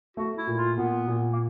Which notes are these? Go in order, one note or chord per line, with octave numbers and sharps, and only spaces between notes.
A3 F#4
E4
A#2
F4
A#2 B3
A#2
A#3